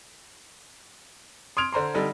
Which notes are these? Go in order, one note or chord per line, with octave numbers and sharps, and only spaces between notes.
C6 D#6 F6 G#6 D7 F7
D3 C5 A#5 C6
D3 G3 D#4 A4